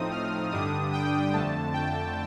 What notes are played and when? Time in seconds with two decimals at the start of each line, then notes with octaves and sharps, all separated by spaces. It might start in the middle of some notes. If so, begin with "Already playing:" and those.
Already playing: A2 F3 A3 C4 D#4 D#6
0.12 F6
0.52 G2 D3 G3 D4 D#6
0.93 G5
1.33 F2 D3 A3 A5
1.74 G5